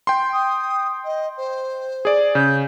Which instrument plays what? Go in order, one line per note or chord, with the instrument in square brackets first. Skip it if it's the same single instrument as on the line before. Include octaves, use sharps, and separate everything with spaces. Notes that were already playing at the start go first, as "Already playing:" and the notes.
[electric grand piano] G5 C6
[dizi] D#6
D#5
C5
[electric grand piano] G#4 D5
[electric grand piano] C#3 [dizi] G6